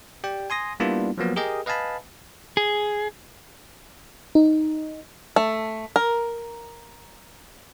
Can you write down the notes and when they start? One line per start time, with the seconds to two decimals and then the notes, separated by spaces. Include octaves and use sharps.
0.24 G4 D5 G5
0.50 G#5 C6 D#6 A#6
0.80 G3 A#3 B3 D4 E4 F4
1.18 F3 F#3 A#3 B3
1.36 G4 G#4 A#4 D#5 G5
1.66 B4 D#5 F5 G#5 A5 B5
2.57 G#4
4.35 D#4
5.36 A3
5.96 A#4